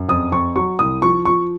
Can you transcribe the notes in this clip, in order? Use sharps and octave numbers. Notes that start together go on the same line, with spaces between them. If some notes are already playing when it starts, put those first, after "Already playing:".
Already playing: F#2
F2 D#6
F2 C#6
F#3 C#6
C2 D#6
F3 C#6
F3 C#6